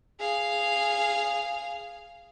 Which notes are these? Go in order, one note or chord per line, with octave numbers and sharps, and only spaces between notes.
G#4 F5